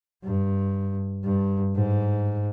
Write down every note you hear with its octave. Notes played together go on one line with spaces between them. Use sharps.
G2
G2
G#2